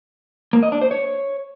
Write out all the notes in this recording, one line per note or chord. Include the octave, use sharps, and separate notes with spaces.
A#3
D#5
D4
C5
C#5